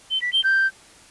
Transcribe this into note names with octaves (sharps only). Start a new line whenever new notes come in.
G7
B6
G7
G6